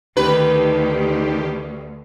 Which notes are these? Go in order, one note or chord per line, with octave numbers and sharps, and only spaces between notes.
D2 D#3 G4 B4